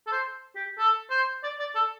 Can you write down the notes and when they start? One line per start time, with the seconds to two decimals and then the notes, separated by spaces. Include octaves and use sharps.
0.07 A4
0.12 C5
0.56 G4
0.78 A4
1.10 C5
1.43 D5
1.60 D5
1.75 A4